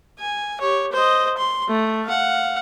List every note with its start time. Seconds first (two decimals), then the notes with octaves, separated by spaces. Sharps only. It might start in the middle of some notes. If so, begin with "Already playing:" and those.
0.19 G#5
0.61 G4 C#5
0.92 C5 D#5
1.37 C6
1.68 A3
2.05 F5 F#5